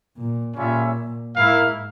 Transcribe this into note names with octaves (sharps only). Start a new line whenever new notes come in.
A#2
A#2 G3 C#4 F4 G#4 E5
G#2 A#3 E4 A#4 F5